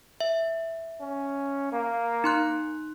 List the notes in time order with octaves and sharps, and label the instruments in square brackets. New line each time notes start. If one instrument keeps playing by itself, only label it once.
[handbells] E5
[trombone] C#4
A#3
[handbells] D#4 C6 F#6